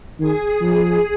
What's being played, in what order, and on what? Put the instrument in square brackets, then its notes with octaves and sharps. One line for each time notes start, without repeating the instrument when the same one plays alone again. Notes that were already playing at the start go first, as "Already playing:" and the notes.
[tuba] D#3 [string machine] G#4
[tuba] F3